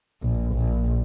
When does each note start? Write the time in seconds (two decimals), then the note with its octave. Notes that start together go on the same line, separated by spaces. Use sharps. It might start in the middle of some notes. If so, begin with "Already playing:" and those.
0.23 A#1
0.54 A#1